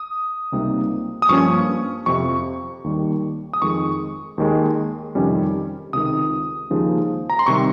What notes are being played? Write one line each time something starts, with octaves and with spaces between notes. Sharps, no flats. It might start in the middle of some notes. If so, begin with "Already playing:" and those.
Already playing: D#6
C#2 C3 G3 A#3 D#4
D#6
G2 F3 A#3 C#4 C#6
F2 C3 F3 C#6
D#2 D#3 G3
D#6
F2 D#3 G#3 C#6
D#2 D#3 G#3
F2 C3 D#3 G3 C#4
C#2 C3 D#3 D#6
D#2 C#3 F3 G#3 D#4
A#5
C6
C3 D#3 G3 C#6